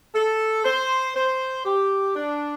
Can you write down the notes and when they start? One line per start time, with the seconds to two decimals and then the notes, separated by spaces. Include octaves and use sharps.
0.15 A4
0.65 C5
1.15 C5
1.65 G4
2.15 D4